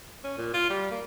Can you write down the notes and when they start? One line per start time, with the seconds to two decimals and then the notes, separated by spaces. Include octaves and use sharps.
0.24 C#4
0.38 A#2
0.54 F4
0.70 G3
0.91 A#3